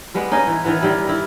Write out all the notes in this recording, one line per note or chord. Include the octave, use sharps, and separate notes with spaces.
G3 G#3 B3
C#4 D#4 G#4 D#5
E3
D#3 E3 B3
D#3 G3 E4
D#3 E4